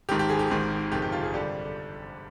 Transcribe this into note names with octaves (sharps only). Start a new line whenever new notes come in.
G#1 G#2 D#3 G4
G4
G#4
G4
G#1 G#2 D#3
G1 F2 C3 D#3 G#3 G4
G4
F4
G#4
D3 G3 G4